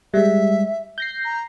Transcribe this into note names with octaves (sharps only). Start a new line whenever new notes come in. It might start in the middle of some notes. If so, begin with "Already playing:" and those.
G3 G#3 E5
G6 A#6 C7
A#5